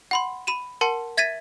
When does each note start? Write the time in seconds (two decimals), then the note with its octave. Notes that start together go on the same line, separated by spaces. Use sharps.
0.11 F#5 B5 C6
0.47 B5 D#7 E7
0.81 A#4 F#5 A5 C6 C#7
1.17 E5 G#6 A6 B6 D#7